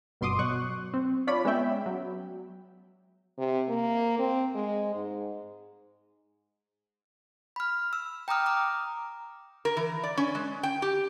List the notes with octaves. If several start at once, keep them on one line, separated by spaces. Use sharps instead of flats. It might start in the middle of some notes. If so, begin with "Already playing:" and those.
G1 B2 C6 D6 D#6
B2 F#3 C#6 F#6
C4
D4 F4 C#5 D5 B5
G#3 B3 C#4 E5 G5
F#3
C3
A#3
C4
G#3
G#2
B5 F6
E6
G5 A#5 D6 D#6 F6
A#5 D6 F6
A#4
E3
D5
C#4
G#3
G5
G4